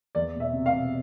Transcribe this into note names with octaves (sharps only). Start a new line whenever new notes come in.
E2 D5
E1
E5
C3
F5
E1